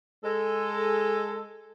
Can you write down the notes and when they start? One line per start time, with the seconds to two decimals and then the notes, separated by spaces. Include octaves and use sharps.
0.24 G#3 A4